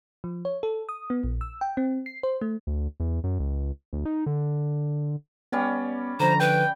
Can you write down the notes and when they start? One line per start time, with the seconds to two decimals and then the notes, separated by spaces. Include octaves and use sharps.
0.24 F3
0.45 C#5
0.63 A4
0.89 D#6
1.10 B3
1.23 A#1
1.41 E6
1.61 G5
1.77 C4
2.06 C7
2.23 C5
2.41 A3
2.67 D2
3.00 E2
3.24 F#2
3.40 C#2
3.93 D2
4.05 D#4
4.26 D3
5.52 G3 B3 C#4 D5
6.20 D3 F3 C5 A#5
6.40 B4 G5